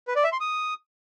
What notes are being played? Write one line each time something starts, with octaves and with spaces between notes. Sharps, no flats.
B4
D5
E5
C6
D#6